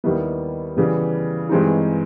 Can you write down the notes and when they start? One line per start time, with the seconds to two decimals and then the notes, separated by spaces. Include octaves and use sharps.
0.04 D#2 D#3 G3 B3 E4
0.77 C#3 E3 G3 B3
1.49 G2 E3 G#3 C4 D#4